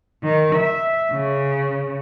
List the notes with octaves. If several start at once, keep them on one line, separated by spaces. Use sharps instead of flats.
D#3
E5
C#3